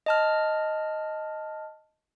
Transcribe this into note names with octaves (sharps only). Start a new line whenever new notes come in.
D#5 A5 F6